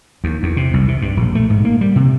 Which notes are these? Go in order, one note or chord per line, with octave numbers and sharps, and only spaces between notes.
D#2
E2
C3
C2
C3
G2
A#1
A3
G#2
A#3
G3
C3